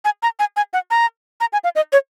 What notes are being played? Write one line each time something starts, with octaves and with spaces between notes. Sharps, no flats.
G#5
A#5
G#5
G#5
F#5
A#5
A#5
G#5
F5
D#5
C#5